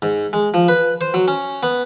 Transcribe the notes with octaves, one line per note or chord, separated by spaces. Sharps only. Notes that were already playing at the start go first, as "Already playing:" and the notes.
G#2
G#3
F3
B4
C5
F#3
C#4
B3